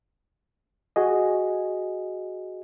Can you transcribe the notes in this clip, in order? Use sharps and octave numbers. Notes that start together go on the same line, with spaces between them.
F#4 G#4 D#5